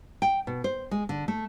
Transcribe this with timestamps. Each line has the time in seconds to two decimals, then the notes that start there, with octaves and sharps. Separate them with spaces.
0.22 G5
0.47 B2
0.64 C5
0.91 G#3
1.09 D3
1.28 A3